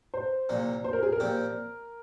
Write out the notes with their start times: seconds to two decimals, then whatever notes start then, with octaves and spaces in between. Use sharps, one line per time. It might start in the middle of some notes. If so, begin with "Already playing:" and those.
0.14 C5
0.49 C2 A#2 F3 A#3
0.84 C5
0.93 A#4
1.03 G#4
1.12 A#4
1.20 A#2 F3 C4 G4